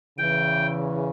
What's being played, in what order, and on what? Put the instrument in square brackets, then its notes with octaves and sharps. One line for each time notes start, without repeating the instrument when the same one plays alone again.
[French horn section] E2 C#3 E3 [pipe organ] G5